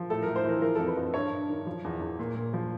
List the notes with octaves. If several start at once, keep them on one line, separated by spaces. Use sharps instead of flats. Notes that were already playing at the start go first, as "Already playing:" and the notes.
Already playing: F3
A2 A4
A2 A#4
C5
E3 A#4
F3 A#4
F2 A4
B4
F2
G2 C#5
G2
D#3
F3
E2
E2
A#2
A#2
F3